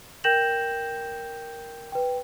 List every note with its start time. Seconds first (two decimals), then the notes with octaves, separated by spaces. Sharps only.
0.24 A#4 G5 G6 A#6 E7 F#7
1.92 B4 G5